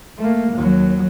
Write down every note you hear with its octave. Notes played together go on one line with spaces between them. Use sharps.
A3 A#3
D#2 F#3